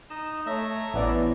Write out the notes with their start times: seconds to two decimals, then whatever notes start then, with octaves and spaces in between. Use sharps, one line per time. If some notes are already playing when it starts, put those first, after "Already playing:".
0.10 D#4 D#5 E7
0.47 A3 C#5 E5 A#5
0.94 A1 E3 B3 D5